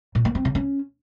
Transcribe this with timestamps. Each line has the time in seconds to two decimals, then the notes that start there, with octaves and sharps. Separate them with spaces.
0.15 A#2
0.25 A#3
0.35 C4
0.45 C#3
0.55 C#4